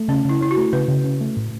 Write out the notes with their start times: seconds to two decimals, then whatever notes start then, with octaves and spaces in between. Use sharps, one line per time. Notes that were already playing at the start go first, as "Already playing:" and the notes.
Already playing: A3
0.08 C#3 C#4
0.25 C#3 E4
0.41 C#4 E4
0.51 F#4
0.57 A3
0.73 C#3 B4
0.88 C#3
1.04 C#4
1.21 A3
1.37 A2